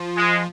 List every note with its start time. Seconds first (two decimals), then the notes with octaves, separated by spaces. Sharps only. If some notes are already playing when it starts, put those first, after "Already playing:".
Already playing: F3 F4
0.17 G#3